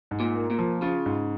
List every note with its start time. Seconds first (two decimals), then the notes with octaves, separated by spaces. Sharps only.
0.11 G#2
0.20 A#2
0.35 A#3
0.50 A#2
0.59 F3
0.82 C#3 F4
1.06 G#2